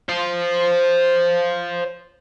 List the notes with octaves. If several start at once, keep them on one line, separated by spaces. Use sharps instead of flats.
C5 F5